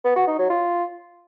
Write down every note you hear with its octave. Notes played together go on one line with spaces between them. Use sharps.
B3
F#4
D#4
F#3
F4